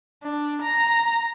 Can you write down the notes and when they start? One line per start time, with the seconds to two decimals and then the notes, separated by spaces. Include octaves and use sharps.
0.23 D4
0.62 A#5